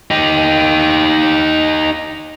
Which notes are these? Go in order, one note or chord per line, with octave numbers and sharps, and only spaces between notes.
D#4 G4